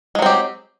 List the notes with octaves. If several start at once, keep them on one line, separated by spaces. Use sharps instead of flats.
F#3 G#3 C4 G4